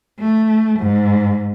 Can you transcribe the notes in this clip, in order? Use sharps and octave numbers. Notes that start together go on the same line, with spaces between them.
A3
G#2